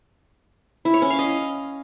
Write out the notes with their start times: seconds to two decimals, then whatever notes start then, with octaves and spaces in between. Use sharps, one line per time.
0.85 E4
0.94 C#5
1.02 C#4
1.10 F5
1.19 D#5